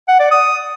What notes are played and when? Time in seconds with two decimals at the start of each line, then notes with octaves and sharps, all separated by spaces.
0.08 F#5
0.20 D5
0.31 D#6